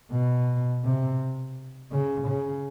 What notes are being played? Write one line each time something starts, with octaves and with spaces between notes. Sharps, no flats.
B2
C3
C#3
C#3